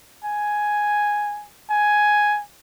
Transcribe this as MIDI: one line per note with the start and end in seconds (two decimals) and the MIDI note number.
0.25 1.46 80
1.70 2.41 80